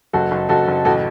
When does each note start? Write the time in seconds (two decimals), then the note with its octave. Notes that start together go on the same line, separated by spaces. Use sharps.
0.13 F#1 F#4 A4
0.31 F#1
0.49 F#1 F#4 A4
0.68 F#1
0.85 A1 F#4 A4